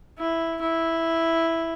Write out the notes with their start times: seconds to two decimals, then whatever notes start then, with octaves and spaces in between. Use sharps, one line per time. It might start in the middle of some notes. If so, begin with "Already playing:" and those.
0.18 E4
0.61 E4